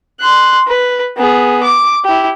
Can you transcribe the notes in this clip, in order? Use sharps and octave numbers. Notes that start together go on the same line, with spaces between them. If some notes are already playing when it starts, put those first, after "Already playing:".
C6 F#6
B4
B3 G#4
D6
E4 G4